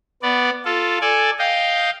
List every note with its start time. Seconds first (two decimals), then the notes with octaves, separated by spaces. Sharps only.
0.23 B3 D5
0.65 F4 A4
1.01 A4 D5 G#5
1.39 D#5 F5 G5